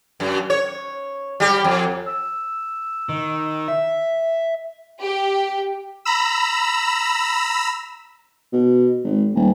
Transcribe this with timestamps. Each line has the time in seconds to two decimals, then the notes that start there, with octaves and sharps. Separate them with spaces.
0.20 F#2
0.50 C#5
1.40 G3 G4
1.64 F2
2.08 E6
3.09 D#3
3.68 E5
5.02 G4
6.05 A#5 B5 E6
8.53 B2
9.04 G#1
9.35 D#1